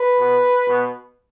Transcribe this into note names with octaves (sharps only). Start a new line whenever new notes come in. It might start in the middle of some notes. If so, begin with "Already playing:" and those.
Already playing: B4
B2 B3
B2 B3